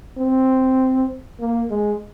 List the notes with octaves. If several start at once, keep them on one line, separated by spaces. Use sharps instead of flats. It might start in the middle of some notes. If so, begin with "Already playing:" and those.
C4
A#3
G#3